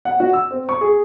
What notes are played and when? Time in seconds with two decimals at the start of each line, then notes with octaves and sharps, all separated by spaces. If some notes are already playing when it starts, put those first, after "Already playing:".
0.05 F#5
0.20 F#4
0.33 E6
0.51 C4
0.69 C#6
0.81 G#4